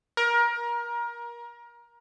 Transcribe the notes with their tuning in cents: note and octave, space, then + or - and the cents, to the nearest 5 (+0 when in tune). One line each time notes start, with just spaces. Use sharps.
A#4 +25